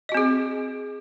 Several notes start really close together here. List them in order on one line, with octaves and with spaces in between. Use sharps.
D#5 F#4 C4 G#4